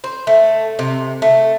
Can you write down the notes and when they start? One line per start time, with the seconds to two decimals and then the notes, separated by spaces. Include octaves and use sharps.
0.04 C5
0.27 A3
0.79 C3
1.22 A3